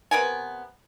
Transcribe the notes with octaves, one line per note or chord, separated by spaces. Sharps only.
C3 B3 A#4 G#5